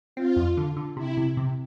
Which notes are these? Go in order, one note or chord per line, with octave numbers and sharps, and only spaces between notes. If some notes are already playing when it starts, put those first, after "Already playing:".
C4 F4
F2
D3
D3
C3 E4
C3
C3